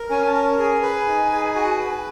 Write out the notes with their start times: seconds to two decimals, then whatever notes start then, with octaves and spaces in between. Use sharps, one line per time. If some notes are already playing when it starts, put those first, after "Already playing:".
Already playing: A#4
0.10 C#4 G#5
0.26 A5
0.34 A#4
0.58 G#4 G#5
0.83 B4
1.07 D#4
1.32 G#4
1.55 F#4
1.79 B4